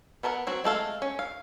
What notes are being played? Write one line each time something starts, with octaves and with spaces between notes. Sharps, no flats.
B3 A4 A#4 D5 F#5
F#3 C4 F#4
G#3 A3 A4 F5
C#4
F5